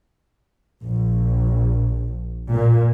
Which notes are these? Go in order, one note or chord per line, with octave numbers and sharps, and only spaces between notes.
A#1
A#2